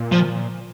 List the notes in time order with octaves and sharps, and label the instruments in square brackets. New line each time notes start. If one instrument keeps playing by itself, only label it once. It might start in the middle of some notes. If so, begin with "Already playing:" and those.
Already playing: [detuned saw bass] A#2
[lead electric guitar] F3